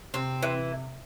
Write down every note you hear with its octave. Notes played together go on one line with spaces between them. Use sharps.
C3 C4
E3